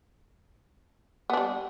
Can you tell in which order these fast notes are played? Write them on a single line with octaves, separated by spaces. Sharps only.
B3 D4 G3